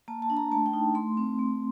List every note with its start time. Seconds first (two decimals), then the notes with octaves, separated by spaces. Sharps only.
0.08 A#3 A5
0.22 A5
0.30 D4
0.37 A#5
0.52 A3 A5
0.66 G5
0.73 D#4
0.95 A3 C6
1.17 C4
1.39 A3